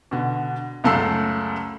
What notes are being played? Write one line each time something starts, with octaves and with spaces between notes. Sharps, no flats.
B2 D3
C#2 F#2 A3 A4 C7